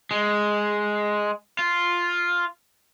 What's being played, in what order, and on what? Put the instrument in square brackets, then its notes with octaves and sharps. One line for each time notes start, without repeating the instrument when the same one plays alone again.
[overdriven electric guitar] G#3
F4